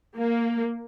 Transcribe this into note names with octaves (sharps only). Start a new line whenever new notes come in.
A#3